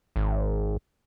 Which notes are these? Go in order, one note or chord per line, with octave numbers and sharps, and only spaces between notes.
G#1